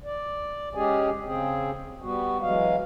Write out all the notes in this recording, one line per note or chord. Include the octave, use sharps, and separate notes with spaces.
D5
G#3 C#4 G4 G#4 G#5
C#3 C4 G#4
G3 B3 F#4
E3 F#3 G#3 F5